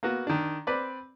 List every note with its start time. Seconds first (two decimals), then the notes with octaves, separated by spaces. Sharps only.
0.03 A#3 B3 F#4
0.27 D#3 D4
0.67 C4 B4 D5